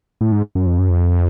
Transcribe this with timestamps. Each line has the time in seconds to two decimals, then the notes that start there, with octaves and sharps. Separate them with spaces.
0.21 A2
0.32 G#2
0.55 F#2
0.66 F2
0.79 F#2
0.90 F2